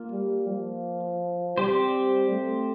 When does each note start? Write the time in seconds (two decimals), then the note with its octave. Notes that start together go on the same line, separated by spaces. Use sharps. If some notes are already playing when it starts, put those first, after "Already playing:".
Already playing: A#3 F4
0.12 G3
0.49 F3
1.58 G3 C4 G4 C5
2.31 A3